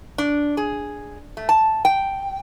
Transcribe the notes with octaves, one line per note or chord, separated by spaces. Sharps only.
D4
G#4
A3
A5
G5